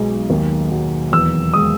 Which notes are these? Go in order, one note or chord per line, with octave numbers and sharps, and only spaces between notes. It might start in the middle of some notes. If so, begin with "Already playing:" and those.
Already playing: B1 G#3
D#2
F#3
E2 E6
G#3 D#6